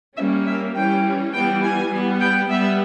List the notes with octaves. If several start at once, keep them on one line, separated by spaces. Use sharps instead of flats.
G3 A#3 C#4 E5
E5
E3 G3 C#4 G5
E3 G3 B3 G5
G#5
G3 B3
G5
G3 B3 E5